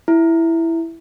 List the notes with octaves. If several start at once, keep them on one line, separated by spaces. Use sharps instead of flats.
E4